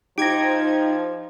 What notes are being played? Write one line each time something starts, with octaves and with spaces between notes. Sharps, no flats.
F3 D#4 G4 G#6 A#6 D7